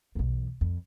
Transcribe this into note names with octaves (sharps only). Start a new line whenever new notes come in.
B1 E2
F2